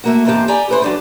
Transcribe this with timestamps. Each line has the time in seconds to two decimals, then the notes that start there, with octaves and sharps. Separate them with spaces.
0.04 A3 A#3 F#4
0.25 E2 G#2 A#3 C4 G4 A5
0.48 G4 D5 G#5 A#5
0.69 E4 B4 C5
0.82 F#3 D4 G4